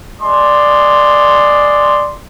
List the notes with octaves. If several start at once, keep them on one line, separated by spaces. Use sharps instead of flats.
G#3 D5 C6